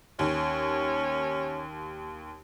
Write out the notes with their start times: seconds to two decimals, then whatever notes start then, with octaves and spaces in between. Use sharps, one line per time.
0.19 D#2 C#4